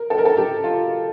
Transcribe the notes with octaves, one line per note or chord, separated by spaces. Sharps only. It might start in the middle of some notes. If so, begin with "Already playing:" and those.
Already playing: A#4
A4
A#4
A4
G4
F4